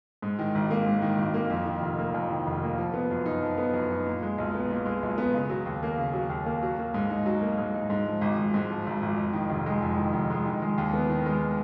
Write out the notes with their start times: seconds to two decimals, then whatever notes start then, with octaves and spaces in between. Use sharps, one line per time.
0.22 G#2
0.39 D#3
0.55 G#1
0.71 A#3
0.86 G#2
1.02 D#3
1.18 G#1
1.34 A#3
1.50 F2
1.66 D#3
1.82 F1
1.99 A#3
2.14 F2
2.30 D#3
2.47 F1
2.63 A#3
2.78 F3
2.94 B3
3.11 F#2
3.26 D#4
3.42 F3
3.58 B3
3.74 F#2
3.91 D#4
4.06 A#2
4.23 G#3
4.38 B1
4.54 B3
4.70 A#2
4.86 G#3
5.03 B1
5.18 B3
5.34 C#3
5.50 F#3
5.66 D#2
5.83 A#3
5.97 C#3
6.13 F#3
6.30 D#2
6.46 A#3
6.63 F#3
6.79 A#3
6.94 G#2
7.10 D#4
7.26 F#3
7.41 A#3
7.58 G#2
7.74 D#4
7.90 G#2
8.06 F3
8.21 G#1
8.38 G#1
8.54 G#2
8.70 F3
8.86 G#1
9.02 G#1
9.17 F2
9.33 D#3
9.50 F1
9.66 G#3
9.82 F2
9.98 D#3
10.13 F1
10.30 G#3
10.46 D#3
10.62 G#3
10.78 D#2
10.93 B3
11.10 D#3
11.26 G#3